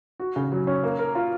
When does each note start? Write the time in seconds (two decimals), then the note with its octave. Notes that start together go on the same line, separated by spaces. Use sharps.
0.20 F#4
0.36 C#3
0.52 F#3
0.67 C#4
0.83 A#3
0.99 A#4
1.15 F4